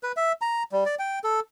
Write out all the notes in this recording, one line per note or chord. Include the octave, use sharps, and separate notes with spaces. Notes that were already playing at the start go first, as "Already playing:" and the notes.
B4
E5
A#5
G3
D5
G5
A4